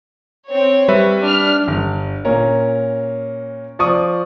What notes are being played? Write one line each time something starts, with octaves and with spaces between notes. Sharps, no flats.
C4 C#5
G3 B4 E5
D4 F6
G1
A#2 C#4 A#4
F3 D5 C#6 D#6